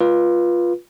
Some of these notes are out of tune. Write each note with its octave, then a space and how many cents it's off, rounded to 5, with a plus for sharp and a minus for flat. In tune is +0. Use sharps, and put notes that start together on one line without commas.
F4 +0 B4 -20